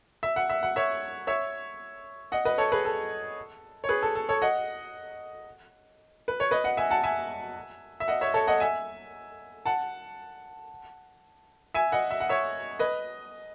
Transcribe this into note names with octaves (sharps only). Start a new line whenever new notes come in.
E5
F#5
E5
F#5
C#5 E5
C#5 E5
D#5 F#5
B4 D#5
A4 C#5
G#4 B4
A4
C#5
G#4 B4
A4
A4
A4 C#5
D#5 F#5
B4
C#5
B4 D#5
D#5 F#5
E5 G#5
F#5 A5
E5 G#5
E5
D#5 F#5
C#5 E5
A4 C#5
D#5 F#5
E5 G#5
F#5 A5
E5 G#5
D#5 F#5
E5
F#5
C#5 E5
B4 D#5